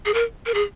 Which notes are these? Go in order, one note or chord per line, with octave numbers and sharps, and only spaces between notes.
G#4
A#4
A#4
G#4